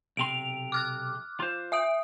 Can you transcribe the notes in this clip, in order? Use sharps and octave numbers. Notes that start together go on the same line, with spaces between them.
B1 C3 C6 D7 F7
D6 F6 F#6
F4 C5
E5 D#6 D7